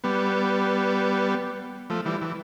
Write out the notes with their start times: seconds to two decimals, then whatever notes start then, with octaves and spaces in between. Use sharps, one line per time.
0.04 G3 B3
1.90 F3 A3
2.05 E3 G3
2.22 E3